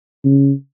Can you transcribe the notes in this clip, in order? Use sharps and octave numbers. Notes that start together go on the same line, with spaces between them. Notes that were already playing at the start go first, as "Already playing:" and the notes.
C#3